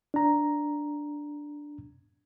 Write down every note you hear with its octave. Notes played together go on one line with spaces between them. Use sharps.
D4 A#5